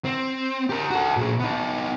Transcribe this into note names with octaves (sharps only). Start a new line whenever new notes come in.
C4
G4 A#4
F#4 A4
A#2 G#4
B3 D#4